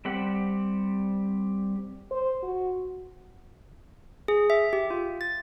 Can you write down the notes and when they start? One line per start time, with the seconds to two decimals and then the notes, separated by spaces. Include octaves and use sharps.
0.05 G3 C4 G4 F#5
2.11 C5
2.43 F#4
4.28 G#4
4.50 E5
4.73 G4
4.90 F4
5.21 A6